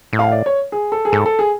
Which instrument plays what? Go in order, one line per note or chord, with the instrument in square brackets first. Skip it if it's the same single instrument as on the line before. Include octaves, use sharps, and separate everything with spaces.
[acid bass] A2
[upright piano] F5
D5
C#5
G#4
A4
G#4
[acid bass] G#2 [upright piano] A4
[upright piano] A4
G#4